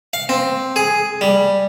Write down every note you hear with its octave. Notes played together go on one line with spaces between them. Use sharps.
F5
C4
G#4
G3